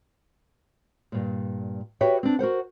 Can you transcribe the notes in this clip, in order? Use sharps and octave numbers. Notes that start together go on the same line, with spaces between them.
G2 A#2
F#4 G4 B4 C#5 E5 G5
C4 D4
F#4 A#4 C5 F#5